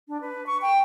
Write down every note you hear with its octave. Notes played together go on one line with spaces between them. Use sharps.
D4
B4
C#6
G5